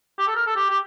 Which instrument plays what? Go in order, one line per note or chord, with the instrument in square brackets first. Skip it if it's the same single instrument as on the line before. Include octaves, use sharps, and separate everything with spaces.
[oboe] G4
A4
A#4
A4
G4
G4